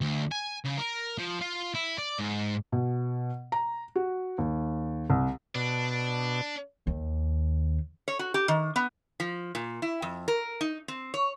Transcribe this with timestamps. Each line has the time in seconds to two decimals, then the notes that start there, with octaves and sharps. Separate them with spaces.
0.01 D2
0.31 G#5
0.65 C#3
0.77 A#4
1.18 F3
1.41 F4
1.74 E4
1.98 D5
2.19 G#2
2.72 B2
3.52 A#5
3.96 F#4
4.38 D#2
5.10 C2
5.55 B2 D4
6.87 D#2
8.08 C#5
8.19 F#4
8.34 G4
8.48 D#3
8.76 B3
9.20 F3
9.55 A#2
9.82 E4
10.02 F2
10.28 A#4
10.61 D#4
10.88 C4
11.14 C#5